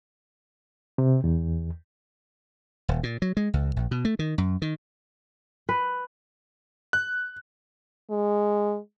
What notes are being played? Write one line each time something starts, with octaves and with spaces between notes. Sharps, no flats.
C3
E2
D#1
A#2
F#3
G#3
C#2
A#1
B2
A3
D#3
F#2
D#3
B4
F#6
G#3